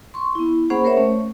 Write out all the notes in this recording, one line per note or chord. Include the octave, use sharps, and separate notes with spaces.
C6 C#6
B3 E4
A#3 C#4 G#4 C5 F#5 B5
A#4 C5 C#5 E5
A3 C#4